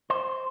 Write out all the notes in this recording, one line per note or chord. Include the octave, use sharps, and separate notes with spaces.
C5